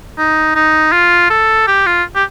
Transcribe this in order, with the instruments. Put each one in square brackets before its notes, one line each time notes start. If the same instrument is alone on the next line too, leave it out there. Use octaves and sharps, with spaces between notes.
[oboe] D#4
D#4
F4
A4
G4
F4
G4